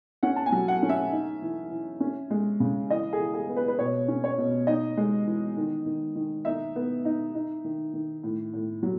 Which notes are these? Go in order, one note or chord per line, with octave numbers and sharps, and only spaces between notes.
C#4 F#5
A5
G#5
F#3
F#5
C#4
E5
D#4
E3
E3
C#4
G#3
C#3
E3 D#5
G#4
E3
G#4
B3
B4
B4
B2 C#5
C#4
C#5
B2
D#4 D#5
G#3
E3
D#3
D#3
D#3
D#4 E5
B3
D#4
D#4
D#3
D#3
A2
A2
F#3